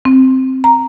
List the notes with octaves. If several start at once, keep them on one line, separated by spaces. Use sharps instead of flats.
C4
A#5